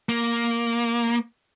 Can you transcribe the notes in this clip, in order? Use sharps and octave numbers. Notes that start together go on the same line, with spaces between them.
A#3